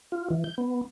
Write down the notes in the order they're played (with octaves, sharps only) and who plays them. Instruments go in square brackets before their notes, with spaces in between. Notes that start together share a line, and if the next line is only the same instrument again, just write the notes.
[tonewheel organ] F4
E3
G6
B3